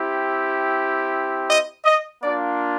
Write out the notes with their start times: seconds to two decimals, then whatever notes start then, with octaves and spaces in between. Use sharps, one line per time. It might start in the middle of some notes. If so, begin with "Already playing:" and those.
Already playing: C4 E4 G4
1.47 D#5
1.85 D#5
2.24 A#3 D4 F4 D5